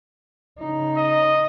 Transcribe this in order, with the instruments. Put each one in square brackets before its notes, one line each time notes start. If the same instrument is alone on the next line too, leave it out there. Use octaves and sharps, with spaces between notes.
[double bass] C#3 D#4
[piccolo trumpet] D#5